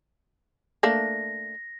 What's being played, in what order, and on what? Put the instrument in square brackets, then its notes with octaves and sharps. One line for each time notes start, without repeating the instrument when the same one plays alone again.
[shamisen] A3 A#3 D4 [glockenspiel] A#6